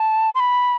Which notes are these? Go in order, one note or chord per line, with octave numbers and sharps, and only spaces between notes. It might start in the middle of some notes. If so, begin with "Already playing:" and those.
Already playing: A5
C6
B5